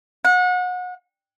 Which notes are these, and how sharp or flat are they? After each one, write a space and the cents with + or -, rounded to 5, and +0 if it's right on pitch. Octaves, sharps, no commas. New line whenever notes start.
F#5 -30